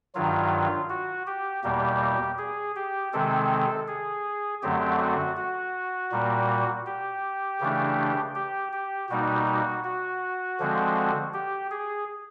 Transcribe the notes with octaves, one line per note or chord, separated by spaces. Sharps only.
G2 D#3 F#3 F4
F#4
G4
E2 B2 G3 A#3 G4
G#4
G4
C3 D#3 G#3 C4 A4
G#4
F#2 D3 F#3 A3 C4 G4
F#4
F#4
A#2 G3 A#3
G4
C#3 E3 A3 D4
G4
G4
B2 G3 A#3 D#4 F#4
F#4
F#4
D3 F3 G#3 C4
G4
G#4